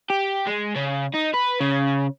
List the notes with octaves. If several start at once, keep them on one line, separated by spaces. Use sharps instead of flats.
G4
G#3
C#3
D#4
B4
C#3